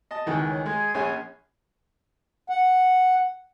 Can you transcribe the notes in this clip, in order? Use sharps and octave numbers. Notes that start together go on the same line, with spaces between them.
D#5 A5
C#2 D#3 E3
C#5
G#3 G#4 G#6
A#1 C#4 G#5
F#5